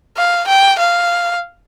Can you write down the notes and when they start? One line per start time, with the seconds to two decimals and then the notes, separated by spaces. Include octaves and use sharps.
0.17 F5
0.48 G5
0.79 F5